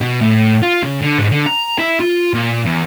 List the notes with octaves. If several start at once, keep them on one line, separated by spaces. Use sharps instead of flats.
B2
A2
F4
C#3
D3
G#2
D3
A#5
E4
F4
A#2
E2